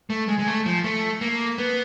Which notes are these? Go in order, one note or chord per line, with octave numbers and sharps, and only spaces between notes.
A3
G#3
G#3
A3
F3
A3
A#3
B3